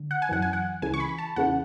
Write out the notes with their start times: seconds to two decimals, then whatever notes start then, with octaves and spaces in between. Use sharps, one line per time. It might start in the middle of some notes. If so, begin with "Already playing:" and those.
Already playing: D3
0.11 F#5
0.22 G#5
0.29 F#2 E3 F#5
0.42 G#5
0.53 F#5
0.82 C#2 C#3 E3 G#5
0.94 C#6
1.00 B5
1.18 A5
1.36 E2 C#3 E3 F#5